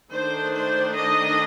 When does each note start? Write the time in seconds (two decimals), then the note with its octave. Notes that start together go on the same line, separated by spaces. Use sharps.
0.11 D#3 A3 D4 C5
0.54 C5
0.96 D#5